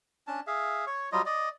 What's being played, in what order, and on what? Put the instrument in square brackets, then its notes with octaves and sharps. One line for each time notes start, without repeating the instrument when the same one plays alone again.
[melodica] C#4 D4 A5
G#4 E5 F5
C#5 C#6
F#3 G3 F4 D#5
D5 D#5